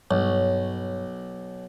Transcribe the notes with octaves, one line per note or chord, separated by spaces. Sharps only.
B1 G2 C#5